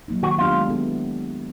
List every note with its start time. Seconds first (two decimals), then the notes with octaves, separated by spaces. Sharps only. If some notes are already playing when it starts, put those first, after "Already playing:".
0.08 F#3 A#3 D#4
0.23 D#3 F#4
0.38 F#3 B3 D4 F4 G4
0.53 G#3
0.68 B3 E4 A4